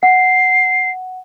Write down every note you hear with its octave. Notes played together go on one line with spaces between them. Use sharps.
F#5 C7